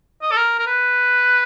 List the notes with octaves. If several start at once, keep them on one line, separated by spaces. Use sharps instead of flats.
D#5
A4
A#4
A#4
B4